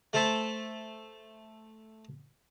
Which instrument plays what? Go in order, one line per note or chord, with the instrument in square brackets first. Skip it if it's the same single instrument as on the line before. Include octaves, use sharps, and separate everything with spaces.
[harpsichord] A3 A4 C5 E5 A5